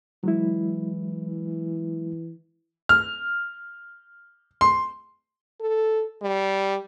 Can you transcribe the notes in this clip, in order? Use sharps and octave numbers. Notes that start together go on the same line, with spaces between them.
E3 F#3 G#3 E4
F6
C6
A4
G3